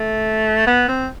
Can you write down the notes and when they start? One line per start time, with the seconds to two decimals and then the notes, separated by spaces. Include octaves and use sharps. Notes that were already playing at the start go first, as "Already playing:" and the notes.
Already playing: A3
0.67 B3
0.88 C4